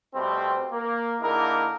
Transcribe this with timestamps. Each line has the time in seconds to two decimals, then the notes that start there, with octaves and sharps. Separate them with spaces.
0.14 B2 G3 A3 C4
0.71 A#3
1.21 D3 A#3 D#4 E4 G#4 A#4